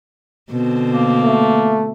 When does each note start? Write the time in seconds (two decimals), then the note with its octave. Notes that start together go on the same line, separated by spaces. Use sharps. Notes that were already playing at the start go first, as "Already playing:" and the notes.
0.51 B2 D3 C4
0.91 A#3
1.24 A3